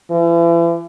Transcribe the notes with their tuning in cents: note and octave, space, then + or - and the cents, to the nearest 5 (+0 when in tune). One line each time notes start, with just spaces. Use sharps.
E3 +40